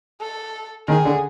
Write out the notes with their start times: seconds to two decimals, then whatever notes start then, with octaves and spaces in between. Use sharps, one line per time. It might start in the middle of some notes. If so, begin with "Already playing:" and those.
0.21 A4
0.88 D#3 G#4
1.05 D3